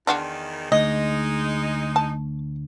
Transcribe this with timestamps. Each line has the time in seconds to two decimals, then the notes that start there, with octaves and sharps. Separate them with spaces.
0.07 E2 D#3 D4 F4 F#4
0.72 D2 G#3 D#4 D#5
1.96 A5